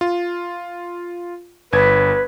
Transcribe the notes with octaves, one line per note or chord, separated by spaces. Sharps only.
F4
G1 B4 G#6